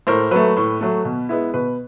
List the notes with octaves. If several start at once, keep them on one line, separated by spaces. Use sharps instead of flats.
A2 A#4 C5
F#3 A3 B4
A2
F#3 A3
B2
G#3 B3 E4
B2 B4